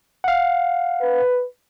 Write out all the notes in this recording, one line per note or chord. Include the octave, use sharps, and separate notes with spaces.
F5 F#5
B4